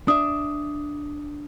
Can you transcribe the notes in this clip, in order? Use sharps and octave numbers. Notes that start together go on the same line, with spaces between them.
D4 E5 D#6